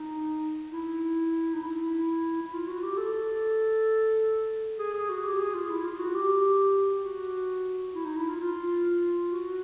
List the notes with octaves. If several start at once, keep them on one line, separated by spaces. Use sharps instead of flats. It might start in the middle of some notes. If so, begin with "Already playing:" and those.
Already playing: D#4
E4
D#4
E4
E4
F4
F#4
G4
A4
G#4
G#4
F#4
G4
G#4
F4
E4
F4
F#4
G4
F#4
E4
D#4
E4
F4
F4
F#4